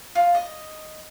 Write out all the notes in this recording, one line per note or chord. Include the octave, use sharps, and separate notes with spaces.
F4
D#5